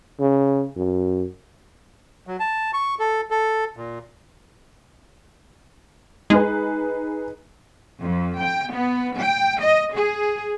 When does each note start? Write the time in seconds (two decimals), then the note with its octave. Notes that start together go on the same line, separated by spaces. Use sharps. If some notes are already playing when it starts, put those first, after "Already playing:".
0.20 C#3
0.77 F#2
2.27 F#3
2.40 A5
2.73 C#6
2.99 A4
3.31 A4
3.77 A#2
6.30 G#3 D#4 G#4 B4
8.02 F2
8.40 G5
8.70 B3
9.20 G5
9.60 D#5
9.96 G#4